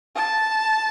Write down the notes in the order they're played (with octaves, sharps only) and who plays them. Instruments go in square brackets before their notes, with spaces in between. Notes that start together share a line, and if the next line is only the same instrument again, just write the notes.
[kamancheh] A5